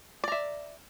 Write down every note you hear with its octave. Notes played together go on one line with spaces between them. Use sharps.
D5 E5 A#5